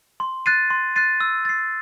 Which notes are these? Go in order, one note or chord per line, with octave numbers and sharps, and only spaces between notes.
C6
F#6 A6 C7 D#7
C6
F#6 A6 C7 D#7
E6
A6 C7